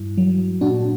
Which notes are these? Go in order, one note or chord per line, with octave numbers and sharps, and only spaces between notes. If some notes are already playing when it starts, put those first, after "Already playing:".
Already playing: G2 E4
F#3
A#2 D4 F#4